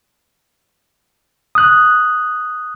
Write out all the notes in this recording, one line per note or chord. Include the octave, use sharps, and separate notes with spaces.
D#6 F#6